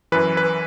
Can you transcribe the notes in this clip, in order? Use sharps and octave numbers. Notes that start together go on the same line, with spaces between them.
F#2 E3 B4
B4